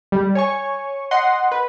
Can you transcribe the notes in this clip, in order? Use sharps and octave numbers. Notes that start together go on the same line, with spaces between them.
G3
C#5 G#5 C#6
D#5 F#5 C6
B4